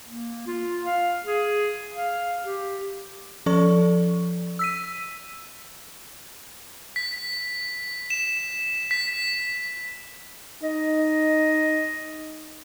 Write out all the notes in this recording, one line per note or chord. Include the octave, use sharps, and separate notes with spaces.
A#3
F4
F5
G#4
F5
G4
F3 C#4 A4 D5 C#6
E6 B6 D#7
B6
E7
B6
D#4 D#5